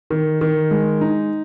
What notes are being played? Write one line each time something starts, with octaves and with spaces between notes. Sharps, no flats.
D#3
D#3
G#3
D#4